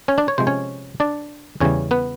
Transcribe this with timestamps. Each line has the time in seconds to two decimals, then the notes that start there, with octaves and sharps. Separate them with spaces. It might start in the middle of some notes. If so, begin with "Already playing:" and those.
0.08 C#4 C#5
0.18 D4 D5
0.28 C#5
0.38 C3 F3 G#3 C5
0.47 C#4 C#5
1.00 D4 D5
1.60 E2 C#3 E3 G3 C#4 C#5
1.91 B3 B4